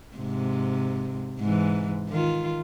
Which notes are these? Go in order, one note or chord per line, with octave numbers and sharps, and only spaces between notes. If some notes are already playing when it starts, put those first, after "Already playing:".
G#2 C3
G#2 E3
D#3 F4